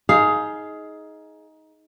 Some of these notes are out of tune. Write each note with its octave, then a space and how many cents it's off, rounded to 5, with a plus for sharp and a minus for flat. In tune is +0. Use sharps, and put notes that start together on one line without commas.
D#4 +15 G#4 +15 F5 -10